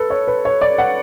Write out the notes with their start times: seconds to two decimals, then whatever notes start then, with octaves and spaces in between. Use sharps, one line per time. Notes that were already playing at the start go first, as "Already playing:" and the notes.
Already playing: A4 B4
0.10 C#5
0.28 B4
0.45 C#5
0.61 D5
0.78 F#5